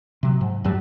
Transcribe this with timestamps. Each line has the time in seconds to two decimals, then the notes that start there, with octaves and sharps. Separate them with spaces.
0.23 C3 F#3
0.41 G#2
0.64 F#2 F#3 G3